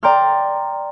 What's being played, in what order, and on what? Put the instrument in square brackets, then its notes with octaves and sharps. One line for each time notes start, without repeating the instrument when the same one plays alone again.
[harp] D5 G5 A#5 C6 F6